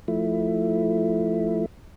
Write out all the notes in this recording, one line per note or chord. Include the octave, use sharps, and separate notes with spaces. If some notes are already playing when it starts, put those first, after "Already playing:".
F3 A3 E4